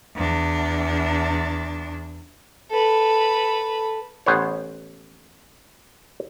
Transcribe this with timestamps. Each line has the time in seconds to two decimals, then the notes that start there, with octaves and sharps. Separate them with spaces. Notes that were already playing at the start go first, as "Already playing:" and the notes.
0.15 E2 D4
2.70 A4 B4
4.26 A1 B3 C5 C#5